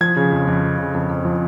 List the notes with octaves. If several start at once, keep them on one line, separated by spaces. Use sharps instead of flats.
F3 G#6
C#3
F2
F2
F3
C#3
F2
F2
F3